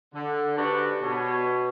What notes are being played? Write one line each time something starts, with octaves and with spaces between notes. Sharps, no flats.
D3
G#2 D4 F#4 G4 B4 D5
B2 C#5